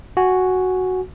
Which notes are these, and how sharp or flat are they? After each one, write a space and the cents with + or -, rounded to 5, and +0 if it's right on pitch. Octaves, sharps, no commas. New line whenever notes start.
F#4 +0 G#5 -5